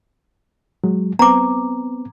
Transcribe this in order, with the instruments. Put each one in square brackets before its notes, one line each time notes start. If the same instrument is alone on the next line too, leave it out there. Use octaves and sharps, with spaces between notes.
[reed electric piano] F#3 G#3
[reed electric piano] B3 C4 [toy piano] A#5 D6